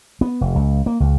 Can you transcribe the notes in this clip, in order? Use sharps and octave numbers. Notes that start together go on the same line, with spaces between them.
B3
F1
C#2
A#3
C#2